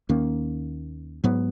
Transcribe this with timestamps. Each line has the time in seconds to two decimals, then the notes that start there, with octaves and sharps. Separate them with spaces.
0.09 D#2 D#3 A#3 C#4
1.24 G#2 F#3 B3